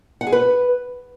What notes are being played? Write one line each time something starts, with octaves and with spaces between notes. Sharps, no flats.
F#5
G#4
B4